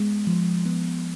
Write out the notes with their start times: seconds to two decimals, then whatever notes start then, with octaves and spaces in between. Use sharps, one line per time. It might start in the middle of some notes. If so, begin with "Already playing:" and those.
Already playing: G#3 B3
0.27 F3
0.65 B3